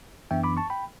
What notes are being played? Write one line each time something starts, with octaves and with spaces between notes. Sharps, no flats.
F#2 E3 B3 D4 E5 G5
B5 D6
A5 C#6
G5 B5